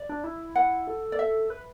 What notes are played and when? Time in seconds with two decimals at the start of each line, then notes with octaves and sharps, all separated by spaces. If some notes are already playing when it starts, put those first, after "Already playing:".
Already playing: D5
0.09 D4
0.24 E4
0.55 F#5
0.87 A4
1.12 D5
1.19 E5
1.50 B4